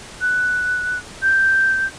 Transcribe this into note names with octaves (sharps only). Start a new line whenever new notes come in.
F#6
G6